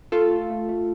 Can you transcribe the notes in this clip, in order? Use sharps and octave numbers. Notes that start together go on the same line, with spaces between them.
A3 F4 A4
A3
A3
A3